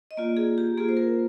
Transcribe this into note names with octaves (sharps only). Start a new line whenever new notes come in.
D#5
A#3 F4 D5
G#4
G4
A#3 F4 G#4
C5
A#4